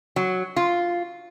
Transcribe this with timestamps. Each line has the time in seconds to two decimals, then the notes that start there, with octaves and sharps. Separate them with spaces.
0.16 F#3
0.56 F4